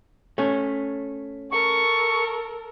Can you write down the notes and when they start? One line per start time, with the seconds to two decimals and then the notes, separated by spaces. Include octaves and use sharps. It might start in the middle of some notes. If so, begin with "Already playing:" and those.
0.38 A3 C#4
1.51 A4 A#4 C#6